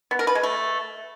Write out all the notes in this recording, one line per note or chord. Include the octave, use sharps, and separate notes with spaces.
B3
A#4
B4
G#3
A3